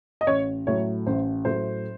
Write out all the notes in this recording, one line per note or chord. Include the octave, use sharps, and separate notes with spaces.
D#5
A1 C#5
A2 F#3 A3 C#5
A1 C5
A2 F#3 A3 C5